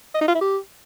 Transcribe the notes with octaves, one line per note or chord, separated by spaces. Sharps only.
D#5
D#4
F4
E4
G4